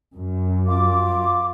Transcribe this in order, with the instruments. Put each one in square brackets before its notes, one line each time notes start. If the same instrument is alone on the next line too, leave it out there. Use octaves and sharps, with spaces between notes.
[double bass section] F#2
[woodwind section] F4 D6